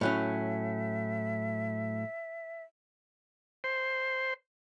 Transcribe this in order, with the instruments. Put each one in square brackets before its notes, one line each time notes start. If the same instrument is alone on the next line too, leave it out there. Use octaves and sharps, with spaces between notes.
[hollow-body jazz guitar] A2 F#3 C#4 [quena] E5
[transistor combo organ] C5